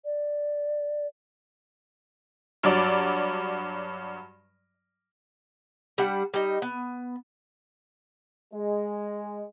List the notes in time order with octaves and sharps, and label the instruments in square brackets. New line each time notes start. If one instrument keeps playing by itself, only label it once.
[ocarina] D5
[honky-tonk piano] G2 F#3 D5
[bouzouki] G3 D4 F#5
G3 D#4
B3
[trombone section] G#3